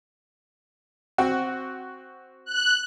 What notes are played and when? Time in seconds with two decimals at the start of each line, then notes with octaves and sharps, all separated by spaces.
1.18 C4 F#4
2.45 F#6